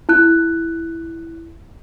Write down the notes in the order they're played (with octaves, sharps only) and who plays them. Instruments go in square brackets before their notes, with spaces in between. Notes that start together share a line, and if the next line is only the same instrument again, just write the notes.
[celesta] E4 F#6